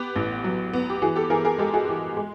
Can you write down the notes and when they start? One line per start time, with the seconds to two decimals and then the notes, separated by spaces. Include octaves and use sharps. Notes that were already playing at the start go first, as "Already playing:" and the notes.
Already playing: B3 G4
0.15 A1
0.44 F#3
0.73 B3
0.90 G4
1.02 E3 F#4 G#4
1.16 G4 A4
1.30 E3 G#4 A#4
1.45 G#4 A#4
1.58 G#3 G4 A4
1.74 F#4 G#4
1.87 E3 G4
2.17 G#3